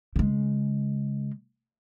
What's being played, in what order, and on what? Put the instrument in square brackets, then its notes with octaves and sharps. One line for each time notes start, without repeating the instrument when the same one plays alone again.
[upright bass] C#3 G#3